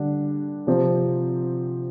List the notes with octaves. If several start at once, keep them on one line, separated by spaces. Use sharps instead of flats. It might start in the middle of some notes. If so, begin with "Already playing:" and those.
Already playing: D3 G3 D4
C3 F3 C4